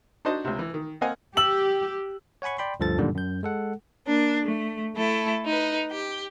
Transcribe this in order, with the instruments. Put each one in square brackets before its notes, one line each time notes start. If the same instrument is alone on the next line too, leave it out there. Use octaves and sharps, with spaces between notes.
[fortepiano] D4 D#4 F#4 C5 D#5 A5
C#2 C3
E3
D#3
A#3 C4 D#5 F5 F#5 G#5
[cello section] G4 [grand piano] E6 F#7
[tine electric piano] C#5 F#5 G#5 B5 C#6
D5 G5 B5 C6
D2 G2 F3 A4 A6
F#2 A#2 D3 D#3 G3
F#2 G6
G#3 A4 F#5
[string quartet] A#3 D4
A3
A3 E4 A4
D#4 B4
G4